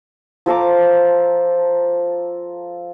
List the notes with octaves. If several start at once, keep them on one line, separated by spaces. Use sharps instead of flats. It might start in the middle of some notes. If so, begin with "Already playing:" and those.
F3 A4 A#5 D6